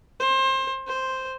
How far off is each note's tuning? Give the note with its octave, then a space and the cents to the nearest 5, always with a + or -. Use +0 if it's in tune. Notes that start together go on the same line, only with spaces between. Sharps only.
C5 +25
C5 +0